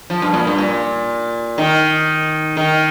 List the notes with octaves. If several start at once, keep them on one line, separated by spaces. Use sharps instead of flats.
F3
G2
A#2
G2
A#2
D#3
D#3